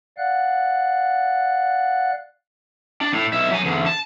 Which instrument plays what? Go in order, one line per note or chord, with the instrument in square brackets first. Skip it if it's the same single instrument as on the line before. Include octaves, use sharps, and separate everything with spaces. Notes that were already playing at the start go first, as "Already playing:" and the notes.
[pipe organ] D5 F5 F#5 F#6
[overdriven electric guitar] D4
A2
B1 E5
F#3 G#5
E2 D3
A5